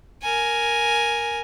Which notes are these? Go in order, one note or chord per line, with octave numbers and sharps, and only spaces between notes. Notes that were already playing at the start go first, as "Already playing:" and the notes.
A#4 G#5